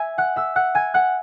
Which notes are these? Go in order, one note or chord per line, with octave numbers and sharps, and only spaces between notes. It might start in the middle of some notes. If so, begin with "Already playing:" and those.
Already playing: E5 G#5 E6 G#6
F#5 F#6
E5 E6
F#5 F#6
G#5 G#6
F#5 F#6